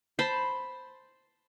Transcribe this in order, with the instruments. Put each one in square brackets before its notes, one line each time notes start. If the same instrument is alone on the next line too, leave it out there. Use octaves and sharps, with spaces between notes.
[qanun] C5 A5 B5